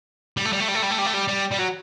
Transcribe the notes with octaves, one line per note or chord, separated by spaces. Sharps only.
G3
A3
G3
A3
G3
A3
G3
A3
G3
A3
G3
G3
G3
F#3